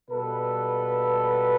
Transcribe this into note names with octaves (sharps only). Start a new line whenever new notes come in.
B2 G3 A#3 A4 B4